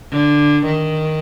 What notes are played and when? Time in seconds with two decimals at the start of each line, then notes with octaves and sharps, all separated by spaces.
0.11 D3
0.66 D#3